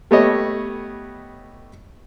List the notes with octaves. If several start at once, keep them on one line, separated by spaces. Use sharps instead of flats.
G3 A3 B3 G4 C#5 D#5